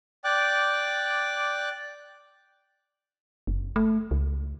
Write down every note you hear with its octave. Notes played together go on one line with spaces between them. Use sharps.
D5 G5 D6 F#6
F#1
A3
C#2